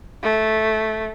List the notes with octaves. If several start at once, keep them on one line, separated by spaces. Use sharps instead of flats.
A3